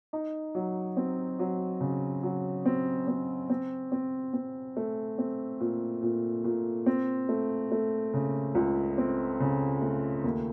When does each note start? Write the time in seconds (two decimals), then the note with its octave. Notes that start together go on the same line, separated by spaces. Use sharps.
0.13 D#4
0.55 F#3
0.97 C4
1.39 F#3
1.81 C#3
2.23 F#3
2.66 C4
3.08 C4
3.50 C4
3.92 C4
4.33 C4
4.77 A3
5.18 C4
5.60 A#2
6.03 A#2
6.44 A#2
6.86 C4
7.29 A3
7.72 A3
8.14 C#3
8.55 C#2
8.98 C4
9.40 C#3
9.82 A3
10.24 D#2